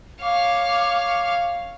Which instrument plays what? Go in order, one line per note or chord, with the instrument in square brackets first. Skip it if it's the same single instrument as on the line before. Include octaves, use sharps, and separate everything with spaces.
[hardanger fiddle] C#5 F5 [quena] D6